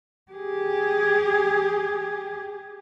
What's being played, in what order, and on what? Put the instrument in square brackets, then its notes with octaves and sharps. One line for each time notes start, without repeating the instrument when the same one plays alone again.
[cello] G4 G#4